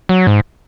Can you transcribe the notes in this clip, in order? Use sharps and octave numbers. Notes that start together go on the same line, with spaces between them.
F#3
G#2